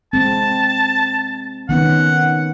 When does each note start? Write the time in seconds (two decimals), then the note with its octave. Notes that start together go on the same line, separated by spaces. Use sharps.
0.13 G#3 C4 A5
1.69 D#3 B3 C#4 F#5